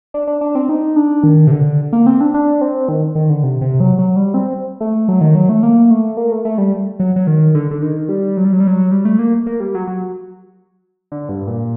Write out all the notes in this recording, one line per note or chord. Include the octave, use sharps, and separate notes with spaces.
D4
D4
D4
C4
D#4
D4
D#3
C3
D3
A#3
C4
D4
D4
C4
D#3
D#3
D3
C3
C3
F#3
F#3
G3
C4
A3
F#3
D#3
F#3
A3
A#3
A3
A#3
A3
A3
G3
F#3
F#3
D#3
D3
D3
D#3
G3
F#3
G3
F#3
G3
F#3
G3
A3
A#3
A#3
G3
F#3
F#3
D3
G2
A#2